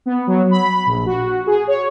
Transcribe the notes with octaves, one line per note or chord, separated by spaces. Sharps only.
B3
F#3
B5
A#1
F#4
G#4
C#5